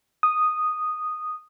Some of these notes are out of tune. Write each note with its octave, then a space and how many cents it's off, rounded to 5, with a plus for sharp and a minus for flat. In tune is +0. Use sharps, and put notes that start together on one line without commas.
D#6 -5